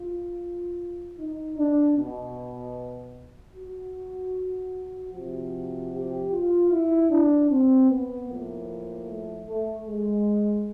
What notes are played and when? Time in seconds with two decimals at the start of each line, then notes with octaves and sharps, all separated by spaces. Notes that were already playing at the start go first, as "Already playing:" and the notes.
Already playing: F4
1.19 D#4
1.58 D4
1.98 B2
3.56 F#4
5.13 C3 F3 F#4
5.92 G4
6.32 F4
6.71 E4
7.11 D4
7.50 C4
7.90 B3
8.28 A2 F3 A#3
9.08 A3
9.47 A3
9.87 G#3